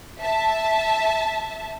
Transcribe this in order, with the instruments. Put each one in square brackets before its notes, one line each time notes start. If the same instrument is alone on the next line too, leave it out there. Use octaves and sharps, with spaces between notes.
[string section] E5 A5